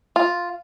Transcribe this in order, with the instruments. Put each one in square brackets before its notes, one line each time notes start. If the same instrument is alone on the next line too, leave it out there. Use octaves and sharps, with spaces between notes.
[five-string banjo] F4